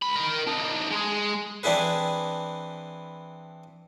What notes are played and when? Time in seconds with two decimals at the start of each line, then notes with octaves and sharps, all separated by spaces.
0.02 C#2 B5
0.16 A#4 D#5
0.48 D4 D#4
0.92 G#3 G#4
1.63 E3 C4 D4 E4 G#4 B4